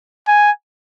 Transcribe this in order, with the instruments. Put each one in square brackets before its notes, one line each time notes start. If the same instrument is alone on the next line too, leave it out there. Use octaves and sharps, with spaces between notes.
[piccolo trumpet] G#5